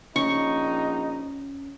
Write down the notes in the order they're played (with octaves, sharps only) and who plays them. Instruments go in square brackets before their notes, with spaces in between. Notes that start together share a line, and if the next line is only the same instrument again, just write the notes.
[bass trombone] A#1 [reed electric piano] C#4 [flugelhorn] D#4 [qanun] C#6